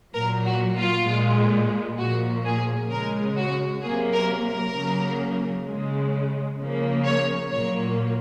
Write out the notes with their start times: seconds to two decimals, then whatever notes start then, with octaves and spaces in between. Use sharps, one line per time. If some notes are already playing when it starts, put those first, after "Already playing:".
0.14 A#2 F#3 A#3 A#4
0.45 F#4
0.76 F4
1.06 A#2 G#3
1.98 A#2 F3 A#3 F#4
2.45 G#4
2.90 C#3 G#3 A#4
3.37 F#4
3.82 C3 F#3 A#3 G#4
4.13 A#4
4.43 A#4
4.74 C#3 F#3 A#3
5.66 C#3 G#3
6.58 C#3 F3 A#3
7.05 C#5
7.50 A#2 F#3 A#3 C#5